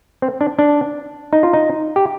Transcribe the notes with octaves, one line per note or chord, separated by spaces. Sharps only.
C4
D4
D4
D#4
F4
D#4
G4